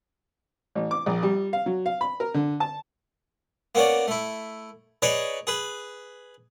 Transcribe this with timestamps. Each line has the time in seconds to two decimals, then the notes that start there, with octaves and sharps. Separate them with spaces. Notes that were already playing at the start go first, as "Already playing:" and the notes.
0.75 A1
0.91 D6
1.06 A#1
1.23 G3
1.53 F5
1.66 F#3
1.86 F5
2.01 B5
2.20 A#4
2.34 D3
2.60 A5
3.75 A#3 B3 C#4 D5
4.07 A3 E4
5.02 D#4 G#4 B4 C#5 D5
5.47 G#4 B4